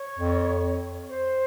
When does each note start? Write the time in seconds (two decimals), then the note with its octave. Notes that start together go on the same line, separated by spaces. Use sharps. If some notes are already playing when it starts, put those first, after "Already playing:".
Already playing: C#5
0.19 F2
1.09 C5